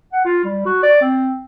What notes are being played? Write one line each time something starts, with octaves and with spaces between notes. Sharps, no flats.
F#5
F4
G3
F#4
D5
C4